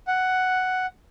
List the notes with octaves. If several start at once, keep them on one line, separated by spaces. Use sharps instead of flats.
F#5